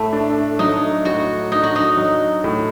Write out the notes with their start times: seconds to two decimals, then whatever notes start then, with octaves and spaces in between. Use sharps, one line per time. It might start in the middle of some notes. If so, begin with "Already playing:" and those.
Already playing: A2 A3
0.13 D4
0.59 F#3 D#4
1.05 A2 F#4
1.52 D4 D#4
1.64 F#4
1.76 D#4
1.97 F#3
2.44 A2